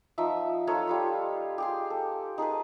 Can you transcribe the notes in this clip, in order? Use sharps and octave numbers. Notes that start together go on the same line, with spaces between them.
F3 D#4 E5 E6
D#4 F4 A4 C#5
G3 F4 B5
G4 G#4 C6
A4
D#4 G#4 A4 B4